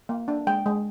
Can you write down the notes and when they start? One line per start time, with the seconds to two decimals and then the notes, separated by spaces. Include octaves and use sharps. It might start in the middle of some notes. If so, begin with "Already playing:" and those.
0.09 A#3
0.28 D4
0.47 G#3 G5
0.66 G#3